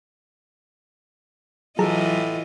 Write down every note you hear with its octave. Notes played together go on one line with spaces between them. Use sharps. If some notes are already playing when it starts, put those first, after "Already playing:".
A2 E3 F#3 F4 G#4 D#5 A5 A#5